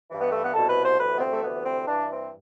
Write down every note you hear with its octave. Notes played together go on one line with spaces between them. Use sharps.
G2 E3
B3
A3
B3
C2 B2 A4
B4
C5
D2 C3 E3 B4
B3
C4
A3
D2 C3 E3 B3
C4
G2 E3 D4
C4